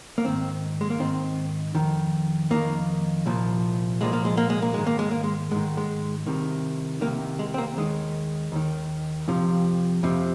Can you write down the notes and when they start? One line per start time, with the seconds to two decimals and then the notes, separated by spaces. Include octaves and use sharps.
0.18 A#3
0.24 G#2 D#3 C4
0.81 G#3
0.90 A#3
1.00 G#2 D#3 C4
1.75 F2 D#3
2.50 F2 D#3 A#3
3.26 C2 A#2 F3
4.01 C2 A#2 F3 G#3
4.13 A#3
4.25 G#3
4.37 A#3
4.50 G#3
4.62 A#3
4.74 G#2 D#3 G#3
4.87 A#3
4.99 G#3
5.11 A#3
5.24 G#3
5.51 G#2 D#3 G#3
5.77 G#3
6.27 C2 C3 D#3
7.01 C2 C3 D#3 A#3
7.39 G#3
7.54 C4
7.58 A#3
7.77 D#2 D#3 G#3
8.52 D#2 D#3
9.28 F2 C3 F3
10.03 F2 C3 F3